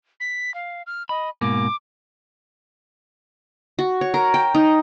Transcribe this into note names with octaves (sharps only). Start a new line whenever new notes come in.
B6
F5
F6
D#5 B5
G#2 B2 A#3 D6
F#4
C#5
A#4
G5
D#4